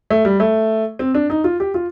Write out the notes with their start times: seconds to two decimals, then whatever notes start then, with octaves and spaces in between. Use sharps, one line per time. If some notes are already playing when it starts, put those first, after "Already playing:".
0.10 A3
0.25 G3
0.40 A3
0.99 C4
1.15 D4
1.30 D#4
1.44 F4
1.60 G4
1.74 F4